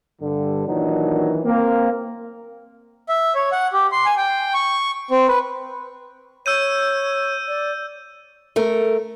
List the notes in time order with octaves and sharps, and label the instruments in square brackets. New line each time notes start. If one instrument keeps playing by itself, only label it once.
[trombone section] G2 D3
A#2 D#3 E3 F#3 D4 D#4
A#3 C4
[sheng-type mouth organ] E5
C#5
F#5
G4
C6
G#5
G5
C#6
C4
B4
[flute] C#5 [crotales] E6 G6 D#7
[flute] D5
[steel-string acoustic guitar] A3 A#4